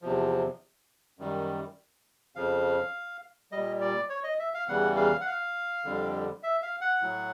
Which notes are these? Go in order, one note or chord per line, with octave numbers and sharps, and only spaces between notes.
E2 C3 F3
F#2 D#3 G3
F2 C#3 F3 F5
A#2 G3 D#5
D5
C#5
D#5
E5
F5
E2 C#3 E3 G3 F#5
F5
F#5
F5
F2 D3 G3
E5
F5
F#5
A2 F#3